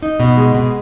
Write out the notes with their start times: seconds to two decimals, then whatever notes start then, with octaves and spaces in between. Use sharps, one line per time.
0.02 D#4
0.20 B2
0.37 G#3
0.55 B2